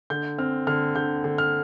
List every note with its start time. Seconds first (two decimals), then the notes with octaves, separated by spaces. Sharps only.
0.10 D3 G6
0.39 C4 F6
0.67 D3 F6
0.95 D3 G6
1.24 D3
1.38 F6